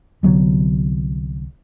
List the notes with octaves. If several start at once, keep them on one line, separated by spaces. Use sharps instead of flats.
C2 D3 F#3 B3